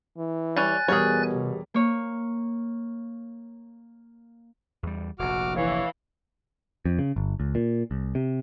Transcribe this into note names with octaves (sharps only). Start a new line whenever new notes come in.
E3
G3 C#5 G#5 F#6 A6
E2 B2 G3 G#4 A#4 C#5
C3
A#3 C#5
E2 G3
F1 A#1 F#4 D6 F6
E3 C#5 F5
F2
C#3
G1
C#2
A#2
C2
C3